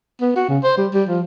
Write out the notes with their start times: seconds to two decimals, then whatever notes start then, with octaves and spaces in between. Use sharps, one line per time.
0.21 B3
0.36 F#4
0.49 C#3
0.64 C5
0.77 G3
0.94 G3
1.09 F3